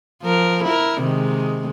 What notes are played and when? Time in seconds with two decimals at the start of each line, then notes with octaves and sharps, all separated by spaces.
0.23 F3 A#4
0.64 E4 A#4
1.01 C3 D#3 G#3